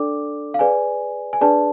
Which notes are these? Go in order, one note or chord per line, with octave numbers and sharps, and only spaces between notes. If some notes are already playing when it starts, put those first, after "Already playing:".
Already playing: D4 A4 D5 D6
F5
G#4 B4 D5 G#5
G#5
D4 G#4 B4 D5 A5